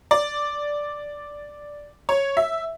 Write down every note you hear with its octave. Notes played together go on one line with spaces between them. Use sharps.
D5
C#5
E5